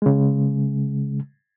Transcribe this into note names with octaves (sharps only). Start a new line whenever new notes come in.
C#3 G#3